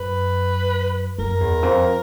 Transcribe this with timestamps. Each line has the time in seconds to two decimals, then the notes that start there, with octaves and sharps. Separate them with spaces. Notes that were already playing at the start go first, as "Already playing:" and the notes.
Already playing: F#2 B4
1.18 F#2 A#4
1.40 E2
1.62 F2